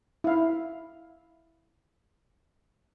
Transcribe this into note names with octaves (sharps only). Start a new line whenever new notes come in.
E4 F5